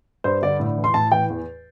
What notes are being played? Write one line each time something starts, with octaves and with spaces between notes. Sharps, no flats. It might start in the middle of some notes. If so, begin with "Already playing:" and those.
G2 C5
D3 D5
A2
E3
C6
A2 A5
E3 G5
E2